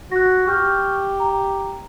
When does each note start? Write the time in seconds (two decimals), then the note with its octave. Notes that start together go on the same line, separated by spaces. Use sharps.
0.12 F#4 F#6 A#6
0.47 G4 C#6 F6 G6
1.20 A#5